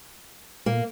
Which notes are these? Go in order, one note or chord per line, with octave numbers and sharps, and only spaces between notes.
A#2 A#3